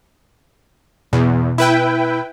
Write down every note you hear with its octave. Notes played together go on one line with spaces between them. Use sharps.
E2 B2
E4 B4 G5